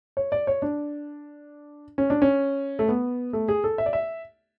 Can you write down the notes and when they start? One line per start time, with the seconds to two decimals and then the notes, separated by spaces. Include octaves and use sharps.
0.17 C#5
0.32 D5
0.47 C#5
0.62 D4
1.98 C#4
2.10 D4
2.22 C#4
2.79 A3
2.89 B3
3.33 A3
3.48 G#4
3.64 A4
3.78 E5
3.86 D5
3.93 E5